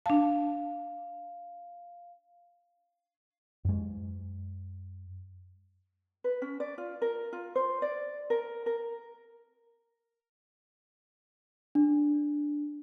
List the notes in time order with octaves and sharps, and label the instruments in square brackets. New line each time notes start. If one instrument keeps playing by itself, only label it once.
[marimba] D4 A5 [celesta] F5
[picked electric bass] F#2 G#3
[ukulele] B4
C#4
D5
F4
A#4
F4
C5
D5
A#4
A#4
[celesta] D4